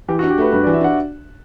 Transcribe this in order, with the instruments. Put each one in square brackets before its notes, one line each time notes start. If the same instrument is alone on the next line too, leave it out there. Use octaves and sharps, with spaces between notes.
[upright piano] E3 [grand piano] G4
[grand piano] F#4
[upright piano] D4
[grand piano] G4
[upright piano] A3 [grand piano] B4
[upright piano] G2 [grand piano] B4
[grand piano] D5
[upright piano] E3
[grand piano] E5
[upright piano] D4 [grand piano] F#5